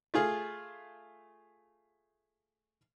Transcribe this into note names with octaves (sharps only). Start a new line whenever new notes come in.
A3 F4 G#4